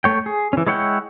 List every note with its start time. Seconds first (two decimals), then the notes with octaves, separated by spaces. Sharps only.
0.04 A3 C#5 G5
0.26 G#4
0.53 E3 C#4
0.67 G#3 E4 C#5 F#5 G5